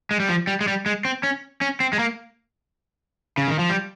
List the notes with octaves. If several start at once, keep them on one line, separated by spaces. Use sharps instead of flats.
G#3
G3
F3
G3
G#3
G3
G#3
C4
C#4
C#4
C4
G#3
A#3
C#3
D#3
F3
G3